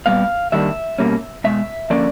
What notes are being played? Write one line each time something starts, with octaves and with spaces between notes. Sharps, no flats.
A#2 G3 B3 F5
D#3 G3 A#3 D4 E5
B2 G3 A#3 C#4
B2 G#3 E5
D3 F3 A#3 C#4 D5